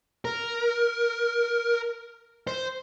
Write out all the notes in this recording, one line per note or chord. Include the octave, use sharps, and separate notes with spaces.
A#4
C5